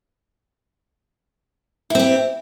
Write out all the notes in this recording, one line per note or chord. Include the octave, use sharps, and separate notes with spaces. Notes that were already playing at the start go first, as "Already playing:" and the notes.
C4 E4 G4